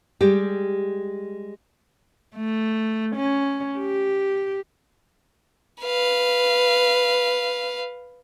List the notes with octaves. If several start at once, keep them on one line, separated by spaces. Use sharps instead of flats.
G3 G#3 G4
A3
C#4
G4
B4 F5